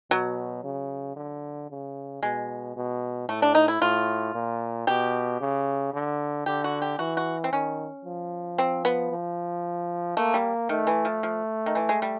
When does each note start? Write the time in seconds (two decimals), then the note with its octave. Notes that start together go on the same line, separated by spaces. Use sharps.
0.11 B2 F#3
0.64 C#3
1.16 D3
1.70 C#3
2.22 B2 G#3
2.76 B2
3.29 A2 A3
3.42 D4
3.55 D#4
3.68 E4
3.81 A2 F4
4.34 A#2
4.87 B2 G4
5.40 C#3
5.94 D3
6.46 D3 G4
6.64 F#4
6.82 G4
6.99 E3 F#4
7.17 F#4
7.44 C4
7.52 D#3 C#4
8.05 F3
8.58 C4
8.85 B3
9.11 F3
10.17 A3 A#3
10.34 G3
10.69 D#3 A3
10.87 E3
11.05 F3
11.23 F3
11.66 D#3
11.75 E3
11.89 G#3
12.02 G3